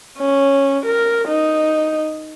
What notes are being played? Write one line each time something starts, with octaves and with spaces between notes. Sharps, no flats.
C#4
A#4
D#4